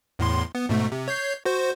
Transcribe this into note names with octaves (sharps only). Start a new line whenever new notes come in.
E2 A2 C6
B3
G#2 B2 A3
C3
C#5 G6 C7
F#4 C5